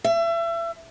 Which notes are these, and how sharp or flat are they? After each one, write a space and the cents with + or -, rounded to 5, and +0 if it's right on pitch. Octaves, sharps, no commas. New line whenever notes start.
E5 +30